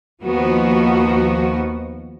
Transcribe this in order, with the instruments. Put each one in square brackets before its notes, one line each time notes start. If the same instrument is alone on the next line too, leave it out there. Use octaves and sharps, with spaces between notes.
[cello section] D#2 F3 B3 F#4